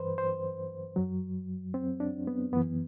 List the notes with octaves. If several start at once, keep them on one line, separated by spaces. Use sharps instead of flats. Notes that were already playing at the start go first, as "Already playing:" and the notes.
Already playing: G2 E3 B4 C5
C5
F#2 F#3
C4
D4
B3
F#2 E3 B3